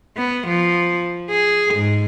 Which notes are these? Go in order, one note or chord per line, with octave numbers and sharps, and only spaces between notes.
B3
F3
G#4
G#2